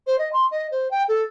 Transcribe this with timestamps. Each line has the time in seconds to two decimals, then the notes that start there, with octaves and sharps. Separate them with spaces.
0.07 C5
0.18 D#5
0.33 C6
0.51 D#5
0.71 C5
0.91 G5
1.08 A4